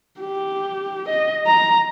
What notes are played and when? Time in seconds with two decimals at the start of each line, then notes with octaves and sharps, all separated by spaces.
0.20 G4
1.09 D#5
1.47 A#5